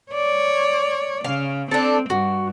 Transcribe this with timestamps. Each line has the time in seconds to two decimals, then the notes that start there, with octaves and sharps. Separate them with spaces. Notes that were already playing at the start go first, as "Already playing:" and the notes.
0.12 C#5 D5
1.25 C#3 F5
1.71 C4 D4 A4
2.10 G2 F#4